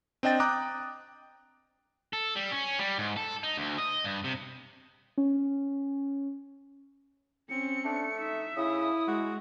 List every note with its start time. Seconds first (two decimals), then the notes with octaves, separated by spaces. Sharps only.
0.23 C4 D4 D#5 G5 A6
0.40 G5 A#5 D6 D#6 F#6
2.13 A4
2.36 G3
2.52 C#4
2.79 G3
2.98 G#2
3.17 A4
3.43 D#4
3.58 D2
3.78 D#5
4.04 G2
4.24 C3
5.18 C#4
7.50 C4 C#4 C#7
7.85 A3 D4
8.20 D#4 E5
8.56 C#3 E4 D#6
9.07 G#3 F#4